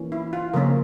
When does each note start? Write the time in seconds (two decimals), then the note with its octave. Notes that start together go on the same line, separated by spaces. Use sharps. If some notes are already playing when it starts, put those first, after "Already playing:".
Already playing: E3 A#3 C#4
0.12 E4
0.33 F4
0.54 C#3 F3 A#3 C#4 A#4